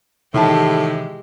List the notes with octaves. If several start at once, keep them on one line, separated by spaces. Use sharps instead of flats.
A2 C3 D#3 E3 G#3 E4 G4 A5